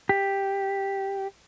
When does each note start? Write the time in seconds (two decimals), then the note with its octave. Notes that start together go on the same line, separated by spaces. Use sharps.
0.09 G4